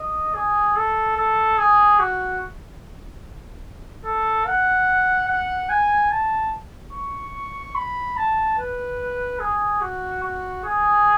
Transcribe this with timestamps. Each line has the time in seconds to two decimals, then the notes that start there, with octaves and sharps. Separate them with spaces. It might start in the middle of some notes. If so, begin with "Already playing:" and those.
Already playing: D#5
0.35 G#4
0.76 A4
1.16 A4
1.58 G#4
1.99 F#4
4.05 A4
4.46 F#5
5.28 F#5
5.69 G#5
6.11 A5
6.93 C#6
7.75 B5
8.17 A5
8.58 B4
9.40 G#4
9.81 F#4
10.22 F#4
10.64 G#4